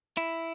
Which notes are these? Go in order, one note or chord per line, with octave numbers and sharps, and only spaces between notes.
E4